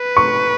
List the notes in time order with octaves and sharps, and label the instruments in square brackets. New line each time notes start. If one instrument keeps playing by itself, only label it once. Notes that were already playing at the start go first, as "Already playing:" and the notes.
Already playing: [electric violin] B4
[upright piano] C#6